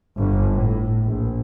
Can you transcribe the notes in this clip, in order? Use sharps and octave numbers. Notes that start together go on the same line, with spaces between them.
G1
A2
A#1